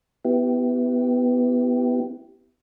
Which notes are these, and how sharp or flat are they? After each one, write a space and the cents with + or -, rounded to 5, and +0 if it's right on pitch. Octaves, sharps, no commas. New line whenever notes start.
B3 +10 E4 +0 G4 -10